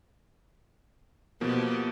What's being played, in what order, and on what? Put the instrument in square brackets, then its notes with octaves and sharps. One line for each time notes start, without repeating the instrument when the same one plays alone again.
[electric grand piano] B2 F3 A#3 [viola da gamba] B3 G4